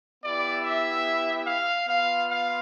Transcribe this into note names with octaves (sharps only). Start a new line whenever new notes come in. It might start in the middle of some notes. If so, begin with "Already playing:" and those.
B3 E4 G4 D5
E5
F5
B3 F4 F5
F5